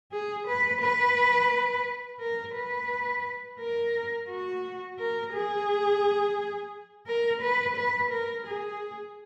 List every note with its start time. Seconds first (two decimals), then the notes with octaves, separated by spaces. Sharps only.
0.12 G#4
0.47 B4
0.81 B4
2.20 A#4
2.56 B4
3.60 A#4
4.29 F#4
4.99 A#4
5.33 G#4
7.07 A#4
7.42 B4
7.76 B4
8.11 A#4
8.47 G#4